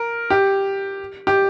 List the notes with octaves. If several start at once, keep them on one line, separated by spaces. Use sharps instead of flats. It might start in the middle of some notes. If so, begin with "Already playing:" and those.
Already playing: A#4
G4
G4